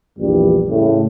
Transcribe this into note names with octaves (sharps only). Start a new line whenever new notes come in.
A#1 E2 G2 G3
A2 C#3 A3